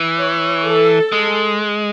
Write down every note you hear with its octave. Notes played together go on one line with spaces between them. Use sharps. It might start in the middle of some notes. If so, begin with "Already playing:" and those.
Already playing: E3
C#5
A4
G#3